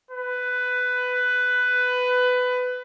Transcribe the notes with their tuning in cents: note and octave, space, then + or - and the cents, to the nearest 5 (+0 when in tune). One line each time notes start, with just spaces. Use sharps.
B4 +15